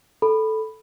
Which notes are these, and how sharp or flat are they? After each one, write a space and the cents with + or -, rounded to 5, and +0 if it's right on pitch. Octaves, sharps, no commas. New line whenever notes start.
A4 -5 B5 +0